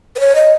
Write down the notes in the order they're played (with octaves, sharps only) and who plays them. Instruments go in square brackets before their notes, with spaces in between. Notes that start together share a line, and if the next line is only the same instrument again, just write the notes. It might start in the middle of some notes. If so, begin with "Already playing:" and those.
[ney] B4
C#5
D#5